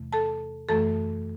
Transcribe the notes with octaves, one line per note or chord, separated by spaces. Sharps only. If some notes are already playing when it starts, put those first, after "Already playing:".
Already playing: E2 C3 E3 A3
A4 A5
F#2 E3 A3 A4 A5